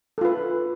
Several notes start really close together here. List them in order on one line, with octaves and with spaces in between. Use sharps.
A4 F4 B4